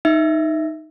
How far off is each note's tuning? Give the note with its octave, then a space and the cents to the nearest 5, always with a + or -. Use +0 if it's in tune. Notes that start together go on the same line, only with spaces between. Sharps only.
D#4 +0 E5 +0